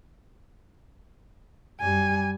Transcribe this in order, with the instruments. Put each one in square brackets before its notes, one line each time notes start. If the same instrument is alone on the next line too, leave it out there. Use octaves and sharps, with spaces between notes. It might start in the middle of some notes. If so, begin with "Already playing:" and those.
[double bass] F#2 G3 [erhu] G#5